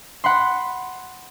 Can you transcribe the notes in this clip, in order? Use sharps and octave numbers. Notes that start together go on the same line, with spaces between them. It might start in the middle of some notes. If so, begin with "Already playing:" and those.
F#5 B5 C6